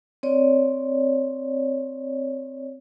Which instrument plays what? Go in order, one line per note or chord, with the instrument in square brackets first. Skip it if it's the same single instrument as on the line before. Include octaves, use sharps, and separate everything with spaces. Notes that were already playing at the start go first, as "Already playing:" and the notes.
[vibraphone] C4 C#5 D5